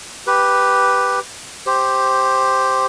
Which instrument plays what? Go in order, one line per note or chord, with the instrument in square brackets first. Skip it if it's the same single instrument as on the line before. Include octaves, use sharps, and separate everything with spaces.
[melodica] G4 B4
G4 C5